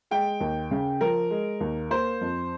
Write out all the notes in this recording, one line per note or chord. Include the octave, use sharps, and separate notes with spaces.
G#3 G5
D#2
C#3
F3 A#4
G#3
D#2
A#3 C5
F2